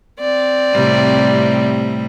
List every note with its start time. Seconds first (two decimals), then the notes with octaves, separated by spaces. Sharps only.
0.20 C4 D5
0.74 A2 C3 G3